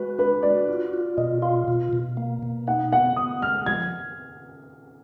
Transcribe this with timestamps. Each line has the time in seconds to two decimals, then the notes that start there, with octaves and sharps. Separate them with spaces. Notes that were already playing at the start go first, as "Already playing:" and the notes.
Already playing: G#3 F#4 B4
0.18 D4 B4
0.43 F#4 D5
0.68 F4
0.93 F4
1.17 B2 D#5
1.42 F4 F5
1.68 B2
1.93 B2
2.17 A#3
2.43 B2
2.67 D#4 F#5
2.92 B3 F#5
3.16 B3 D#6
3.42 G#3 F6
3.66 F3 G#6